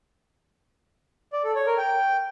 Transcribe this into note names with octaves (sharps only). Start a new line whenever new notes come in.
D5
A4
C#5
A#4
G5